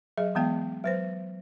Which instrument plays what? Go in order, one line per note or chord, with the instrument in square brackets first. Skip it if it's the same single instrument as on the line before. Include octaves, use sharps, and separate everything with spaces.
[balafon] F#3 G#4 D#5
E3 G#3 B3 F5 G5
F#3 B4 C5